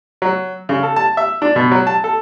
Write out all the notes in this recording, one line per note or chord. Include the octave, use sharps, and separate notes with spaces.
F#3
C#3
A4
A5
E5
D4
B2
F#3
A5
A4